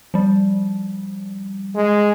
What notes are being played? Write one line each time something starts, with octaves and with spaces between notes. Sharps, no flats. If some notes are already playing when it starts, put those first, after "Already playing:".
F3 G3
G#3